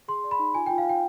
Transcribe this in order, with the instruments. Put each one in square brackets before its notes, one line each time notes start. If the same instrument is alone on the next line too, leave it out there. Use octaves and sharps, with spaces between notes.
[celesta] G#4 C6
D5
B5
D#4
F4 G#5
F4 G5
F5
F4 G5